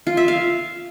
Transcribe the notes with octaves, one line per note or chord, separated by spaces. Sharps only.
F4
E5
F5